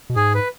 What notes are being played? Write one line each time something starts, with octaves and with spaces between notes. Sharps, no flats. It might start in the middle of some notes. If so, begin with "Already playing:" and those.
B2
G#2 G#4
B4